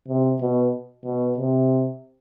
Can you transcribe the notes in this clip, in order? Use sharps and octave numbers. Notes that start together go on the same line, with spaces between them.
C3
B2
B2
C3